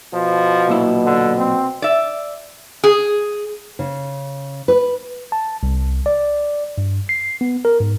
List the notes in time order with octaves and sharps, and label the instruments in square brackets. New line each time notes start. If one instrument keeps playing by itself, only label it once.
[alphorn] B2 [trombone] F3
[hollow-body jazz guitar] B1 A#2 E4
[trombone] D3
C4
[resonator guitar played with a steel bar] D5 E5
G#4
[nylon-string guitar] C#3
B4
[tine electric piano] A5
C2
D5
G2
C7
B3
A#4
G#2